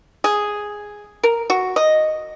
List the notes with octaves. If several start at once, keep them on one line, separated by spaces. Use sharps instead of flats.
G#4
A#4
F#4
D#5